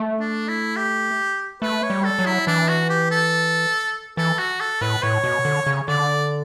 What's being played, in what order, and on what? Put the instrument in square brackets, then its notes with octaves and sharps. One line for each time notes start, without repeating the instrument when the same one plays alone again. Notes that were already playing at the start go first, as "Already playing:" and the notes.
Already playing: [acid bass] A3
[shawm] D4
E4
G4
[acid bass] A3 [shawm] B4
[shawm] C#5
[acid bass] G3
[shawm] A4
[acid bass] F#3
[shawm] E4
[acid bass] E3 [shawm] D4
[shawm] F#4
G4
A4
[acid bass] E3 [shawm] A4
[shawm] F#4
A4
[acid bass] A2 [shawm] B4
[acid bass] A2 [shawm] C#5
[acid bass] B2
D3
C#3
[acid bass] D3 [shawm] D5